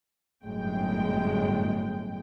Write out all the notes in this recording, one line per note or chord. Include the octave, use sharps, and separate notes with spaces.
G1 F#2 A2 G#3 G5